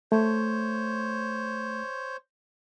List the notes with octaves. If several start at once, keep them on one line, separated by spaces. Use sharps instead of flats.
A3 C5 C#5